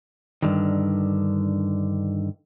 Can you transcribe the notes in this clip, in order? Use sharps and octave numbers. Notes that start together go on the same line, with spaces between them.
G2 D3 D#3